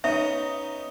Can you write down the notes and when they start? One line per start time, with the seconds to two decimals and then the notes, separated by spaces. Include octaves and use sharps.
0.04 B3 C#4 D#4 E5